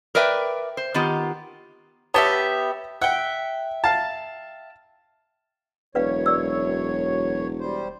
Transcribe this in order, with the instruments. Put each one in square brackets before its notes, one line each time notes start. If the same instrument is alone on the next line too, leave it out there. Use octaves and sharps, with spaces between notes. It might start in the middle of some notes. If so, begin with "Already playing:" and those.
[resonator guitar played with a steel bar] A#4 B4 D5 E5 G5
C5
D#3 B3 F4 G4
[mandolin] B3 G4 E5 [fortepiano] C#5 A5
[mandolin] E5 G5 [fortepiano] F#5
[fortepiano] F5 A5
[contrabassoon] E1 [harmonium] F#2 C#5 [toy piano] B4 D5 F5
[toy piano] D5 E6
[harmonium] G3 C5